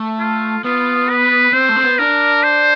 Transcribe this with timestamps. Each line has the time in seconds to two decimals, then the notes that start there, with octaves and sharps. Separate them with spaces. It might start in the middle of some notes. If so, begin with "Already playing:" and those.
Already playing: A3
0.19 F4
0.64 B3 F4
1.09 B4
1.53 C4 C5
1.69 A3
1.76 C4
1.83 B3
1.98 D4 A#4
2.43 C5